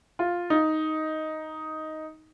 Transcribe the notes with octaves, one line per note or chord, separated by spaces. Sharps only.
F4
D#4